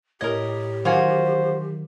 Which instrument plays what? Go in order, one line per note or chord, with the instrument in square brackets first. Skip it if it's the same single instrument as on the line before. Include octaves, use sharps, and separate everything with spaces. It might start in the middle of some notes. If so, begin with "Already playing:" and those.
[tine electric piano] A2 C#5 G#6 [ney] G4 [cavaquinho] A#4 D#5
[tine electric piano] D#3 F#3 [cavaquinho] F4 F#4 G#5 [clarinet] C5